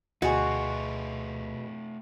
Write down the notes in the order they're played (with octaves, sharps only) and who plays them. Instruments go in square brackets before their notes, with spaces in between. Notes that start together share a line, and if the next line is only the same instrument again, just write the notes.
[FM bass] D2 [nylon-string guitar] B2 G#4 [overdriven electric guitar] A3 F4 [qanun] F#4